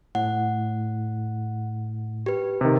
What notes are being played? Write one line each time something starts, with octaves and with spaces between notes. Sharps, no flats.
A2 F#5
G4 B4
C3 D#3